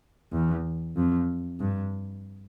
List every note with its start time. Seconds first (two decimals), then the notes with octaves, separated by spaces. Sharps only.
0.32 E2
0.96 F2
1.60 G2